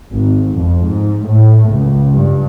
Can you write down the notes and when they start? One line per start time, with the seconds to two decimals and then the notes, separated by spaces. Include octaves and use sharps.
0.13 G#1
0.56 F2
0.85 G#2
1.28 A2
1.70 C#2
2.14 G2